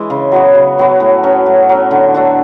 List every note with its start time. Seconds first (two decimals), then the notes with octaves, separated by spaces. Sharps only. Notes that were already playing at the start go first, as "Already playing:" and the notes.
Already playing: E3 G#3
0.10 C#3
0.32 F#3 B3 F#4
0.55 C#3
0.78 F#3 B3 F#4
1.00 A2
1.24 F#3 C#4
1.46 A2
1.69 F#3 C#4
1.91 D3
2.14 A3 D4 F#4